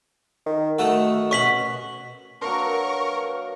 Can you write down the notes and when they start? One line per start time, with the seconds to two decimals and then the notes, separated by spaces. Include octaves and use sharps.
0.46 D#3
0.79 D#3 A3 F#4 A4
1.31 B2 C#4 C#6 B6 F#7
2.41 F#3 A#3 D4 A#4 B4 C#6